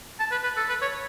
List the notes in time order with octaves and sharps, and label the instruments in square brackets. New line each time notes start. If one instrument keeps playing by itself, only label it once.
[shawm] A5
B4
B4
A4
B4
C#5